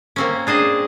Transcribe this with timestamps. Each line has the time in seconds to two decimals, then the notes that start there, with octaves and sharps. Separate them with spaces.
0.16 A#3 C4 C#4
0.47 D4 G#4 C5 D#5